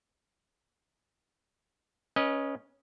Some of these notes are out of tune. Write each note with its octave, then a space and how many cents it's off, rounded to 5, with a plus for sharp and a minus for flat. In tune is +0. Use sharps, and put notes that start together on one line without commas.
C#4 +0 B4 -35 D#5 +0